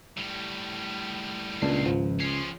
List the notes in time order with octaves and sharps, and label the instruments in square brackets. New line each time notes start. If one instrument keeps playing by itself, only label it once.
[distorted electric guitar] A2 G3
[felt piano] C#2 [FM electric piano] A#2 D4 C7
[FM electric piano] G#1 F3
[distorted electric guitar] F3 C#4 [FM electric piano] C7